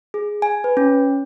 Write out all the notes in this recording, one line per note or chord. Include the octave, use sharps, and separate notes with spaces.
G#4
G#5
B4
C#4